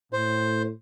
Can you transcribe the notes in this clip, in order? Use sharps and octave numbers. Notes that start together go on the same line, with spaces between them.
A2 C5